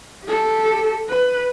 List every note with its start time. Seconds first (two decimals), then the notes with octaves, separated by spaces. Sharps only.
0.25 G4 A4
1.09 B4